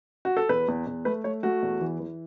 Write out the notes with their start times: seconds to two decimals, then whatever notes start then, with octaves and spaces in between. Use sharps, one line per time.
0.25 F#4
0.37 A4
0.49 E2 B4
0.68 E2
0.87 E2
1.05 A3 B4
1.24 A3 C#5
1.43 A3 F#4
1.62 E2
1.81 E3
2.00 E3